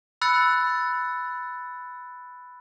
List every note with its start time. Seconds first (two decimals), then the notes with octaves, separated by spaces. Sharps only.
0.21 B5 E6 F#6 A6 C#7